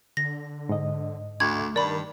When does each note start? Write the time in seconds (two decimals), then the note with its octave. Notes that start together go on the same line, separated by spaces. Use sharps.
0.17 D3 A#6
0.69 G#2 D#5
1.40 D2 A3 G#6
1.76 G2 D#3 A#4 D5 B5